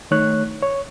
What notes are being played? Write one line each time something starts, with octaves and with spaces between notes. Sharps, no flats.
D#3 A3 D#4 C#5 F#6
C#5